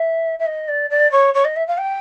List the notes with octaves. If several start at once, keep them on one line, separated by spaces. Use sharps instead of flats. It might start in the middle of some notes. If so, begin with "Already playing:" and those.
Already playing: E5
E5
D#5
D5
D5
C#5
C#5
D#5
E5
F5
G5